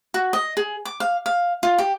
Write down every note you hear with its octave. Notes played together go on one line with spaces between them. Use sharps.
F#4
D#5
G#4
D6
F5
F5
F4
G4